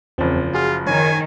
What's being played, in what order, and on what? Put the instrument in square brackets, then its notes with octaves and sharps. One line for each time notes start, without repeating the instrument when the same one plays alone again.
[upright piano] F#1 F3 [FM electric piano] E2 C4
[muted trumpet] F4 [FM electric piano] F#4 G#4
[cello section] D#3 [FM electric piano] C#5 [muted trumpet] G#5